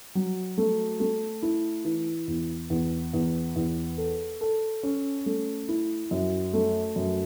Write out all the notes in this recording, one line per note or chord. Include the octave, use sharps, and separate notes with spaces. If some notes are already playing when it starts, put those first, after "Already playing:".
F#3
A3
A3
E4
E3
E2
E2
E2
E2
A4
A4
C#4
A3
E4
F#2
A3
F#2